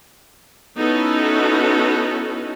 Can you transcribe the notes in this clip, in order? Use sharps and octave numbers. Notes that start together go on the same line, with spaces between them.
B3 C#4 D#4 E4 F#4 A4